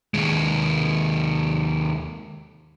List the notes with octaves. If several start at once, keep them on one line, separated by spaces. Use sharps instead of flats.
D#2 G#3